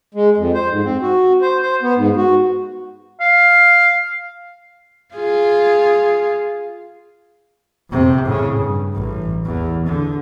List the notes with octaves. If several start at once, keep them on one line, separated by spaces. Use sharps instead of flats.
G#3
F2
C5
G#2
C4
F#4
C5
C5
B3
G#2
F#4
F5
F4 G#4
F2 C3
A2 C#3
G2
A1
E2
D3